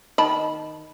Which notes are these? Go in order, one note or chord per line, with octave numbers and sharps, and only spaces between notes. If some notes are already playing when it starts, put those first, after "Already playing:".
D#3 A5 B5